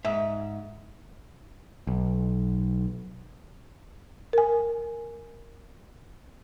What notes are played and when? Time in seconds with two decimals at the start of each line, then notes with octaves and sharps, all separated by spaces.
0.05 G#2 E5
1.87 B1
4.33 A#4 G#5